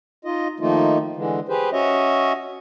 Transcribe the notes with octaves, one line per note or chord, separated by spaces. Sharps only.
D#4 F4 D#5
D#3 F3 A3 A#3 D#4 F4
D3 E3 G#3
G4 G#4 B4 C5
C#4 F#4 C#5 D#5 E5